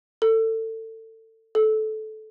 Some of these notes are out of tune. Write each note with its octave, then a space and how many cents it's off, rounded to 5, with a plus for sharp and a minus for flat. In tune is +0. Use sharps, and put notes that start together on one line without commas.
A4 +25
A4 -20